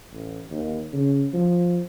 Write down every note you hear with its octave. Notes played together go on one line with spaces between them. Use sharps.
A1
D#2
C#3
F3